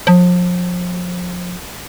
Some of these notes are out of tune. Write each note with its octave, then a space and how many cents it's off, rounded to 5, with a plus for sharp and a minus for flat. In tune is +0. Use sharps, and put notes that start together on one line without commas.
F3 +35